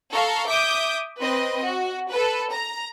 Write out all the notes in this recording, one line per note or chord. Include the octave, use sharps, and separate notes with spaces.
A4 F5 A#5 C#6
E5 D6 D#6 G6
C4 B4 D#5
F#4
A4 B4
A#5